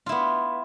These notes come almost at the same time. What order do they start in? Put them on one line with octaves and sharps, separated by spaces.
F4 E4 B3